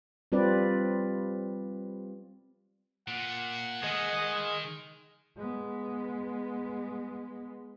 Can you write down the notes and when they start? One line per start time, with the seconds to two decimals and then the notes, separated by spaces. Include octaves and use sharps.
0.32 G3 C4 F4 B4 D5
3.08 A#2 F#5
3.83 D#3 G#4 D#5
5.37 G#3 B3